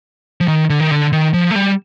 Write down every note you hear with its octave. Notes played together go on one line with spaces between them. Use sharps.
F3
D#3
D3
D#3
D3
D#3
F3
A3
G3